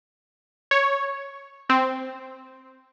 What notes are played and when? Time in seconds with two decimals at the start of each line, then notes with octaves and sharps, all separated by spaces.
0.71 C#5
1.69 C4